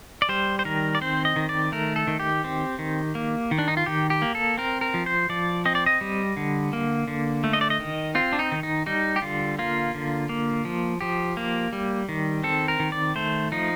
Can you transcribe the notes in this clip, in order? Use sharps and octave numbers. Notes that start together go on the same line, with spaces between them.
D5
G3 C5
C5
D#3 A#4
D5
C4 C5
D#5
D#3
D5
A3 A#4
A4
D#3
G4
C4
D#3
A#3
D#3
D4
D#4
F4
D#3 G4
G4
A#3
A4
C4 A#4
A#4
F3
C5
F3 D5
C4 D#5
D5
D#5
G3
D3
A#3
D3
A3
D#5
D5
D#5
D#3
C4 F4
D4
D#4
D#3
D#4
G3 D#4
G4
D3 F4
A#3 F4
D3
A#3
F3
F3 G4
A#3
G3
D#3
C4 A4
A#4
D#3
D5
A3 C5
F3 D#4